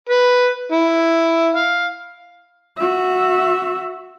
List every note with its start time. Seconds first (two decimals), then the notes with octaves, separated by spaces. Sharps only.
0.09 B4
0.72 E4
1.55 F5
2.78 F#4 E5